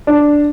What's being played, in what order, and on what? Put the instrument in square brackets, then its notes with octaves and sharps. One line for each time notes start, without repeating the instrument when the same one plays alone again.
[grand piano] D4